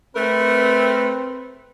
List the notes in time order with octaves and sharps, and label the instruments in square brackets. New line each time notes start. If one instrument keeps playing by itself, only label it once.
[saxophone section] A3 A#4 [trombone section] C4 [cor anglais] B4